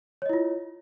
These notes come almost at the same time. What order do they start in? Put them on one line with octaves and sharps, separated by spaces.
C#5 D#5 E4 F4